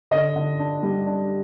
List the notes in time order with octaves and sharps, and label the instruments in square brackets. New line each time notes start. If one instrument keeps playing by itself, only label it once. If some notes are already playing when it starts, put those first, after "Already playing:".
[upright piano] D3 D#5
D3
D4
G3
D4